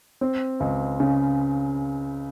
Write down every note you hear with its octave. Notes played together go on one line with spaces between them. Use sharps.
C4
C#2
C#3